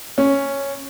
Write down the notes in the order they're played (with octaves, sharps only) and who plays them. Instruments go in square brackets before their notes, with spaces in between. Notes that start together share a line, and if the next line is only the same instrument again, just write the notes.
[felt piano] C#4